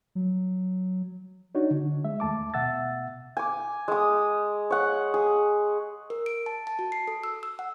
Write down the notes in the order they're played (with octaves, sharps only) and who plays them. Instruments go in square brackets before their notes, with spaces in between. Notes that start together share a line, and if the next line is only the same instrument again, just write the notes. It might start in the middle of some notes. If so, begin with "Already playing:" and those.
[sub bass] F#3
[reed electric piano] D4 D#4 F#4 C#5
D3
G#3 E5
D#2 A3 A5 D6
B2 E5 F#5 E6 A6
[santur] G#5 D6
G#3 D#6
C#5 F#5
G#4
[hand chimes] A#4
D7
A5
A5
F#4
C7
A4
E6
E6
F#5